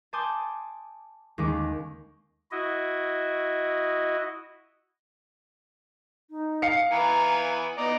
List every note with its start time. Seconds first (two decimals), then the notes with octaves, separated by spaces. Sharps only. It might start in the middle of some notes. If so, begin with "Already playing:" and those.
0.13 G#5 A5 C6 D6 D#6 G6
1.38 D#2 D3 G#3 C#4 D6
2.51 E4 F#4 D#5
6.30 D#4
6.62 F5 C7 C#7
6.91 E3 B3 G#5 A#5
7.78 B3 D5 D#5 A#5